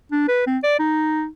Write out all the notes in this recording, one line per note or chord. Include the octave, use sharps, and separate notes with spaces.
D4
B4
C4
D5
D#4